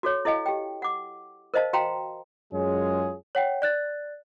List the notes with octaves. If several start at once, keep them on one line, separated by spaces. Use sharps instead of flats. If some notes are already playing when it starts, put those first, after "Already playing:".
F#4 A4 C#5
E4 A4 D#5 F5 G#5
G4 G5
F#5 D6
A#4 C5 D#5 F5 A5
F#4 F5 G5 A#5 C6
F#2 G#3 F4 G#4 C#5
C#5 F#5 G5
D5 F#6 A6